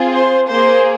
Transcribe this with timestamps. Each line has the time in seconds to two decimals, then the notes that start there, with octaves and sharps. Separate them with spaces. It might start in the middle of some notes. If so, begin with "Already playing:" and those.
Already playing: C4 F4 G#4
0.12 C5
0.50 A#3 G#4 C5